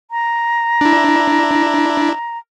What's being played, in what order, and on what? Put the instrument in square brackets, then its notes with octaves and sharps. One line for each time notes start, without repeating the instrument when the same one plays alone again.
[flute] A#5
[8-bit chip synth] D4 E4